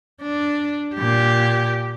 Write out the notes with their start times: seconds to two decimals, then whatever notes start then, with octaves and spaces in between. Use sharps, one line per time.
0.21 D4
0.95 A#2 G4